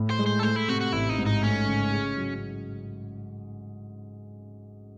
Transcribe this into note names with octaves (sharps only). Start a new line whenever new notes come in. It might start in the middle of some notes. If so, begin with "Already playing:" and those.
Already playing: A2
C5
G#3
C5
A4
A3 C5
E4
C3 F#4
F#4
A1 E4
D#4
G#2
D#4
A3 C#4
C#3
G#4
F#3